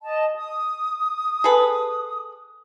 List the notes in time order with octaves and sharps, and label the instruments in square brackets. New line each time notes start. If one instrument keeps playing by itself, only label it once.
[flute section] D#5 A5
D#6
[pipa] G#4 A4 B4